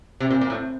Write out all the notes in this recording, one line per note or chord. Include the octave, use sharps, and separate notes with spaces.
C3
A#2
A#2
A2